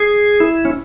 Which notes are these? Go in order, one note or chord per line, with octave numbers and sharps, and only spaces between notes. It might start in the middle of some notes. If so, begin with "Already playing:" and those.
Already playing: G#4
E4
C#4